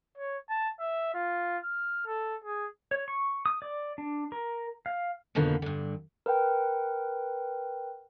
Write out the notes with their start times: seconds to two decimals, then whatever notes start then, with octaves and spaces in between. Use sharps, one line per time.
0.18 C#5
0.49 A5
0.80 E5
1.14 F4
1.64 F6
2.06 A4
2.44 G#4
2.91 C#5
3.08 C#6
3.46 D#6
3.62 D5
3.98 D4
4.32 A#4
4.86 F5
5.35 F2 B2 D3 F3 A#3 B4
5.62 G2 D3
6.26 A#4 B4 F#5 G5